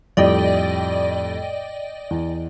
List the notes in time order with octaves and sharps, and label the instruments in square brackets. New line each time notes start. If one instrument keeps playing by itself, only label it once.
[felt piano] F2 A2 G3 [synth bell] D5 D#5 G5
[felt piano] E2